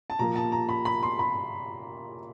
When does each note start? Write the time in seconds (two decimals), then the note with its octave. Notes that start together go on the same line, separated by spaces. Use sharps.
0.10 A5
0.19 A#2 F3 A#3 A#5
0.36 A5
0.52 A#5
0.69 B5
0.85 B5
1.03 C6
1.19 B5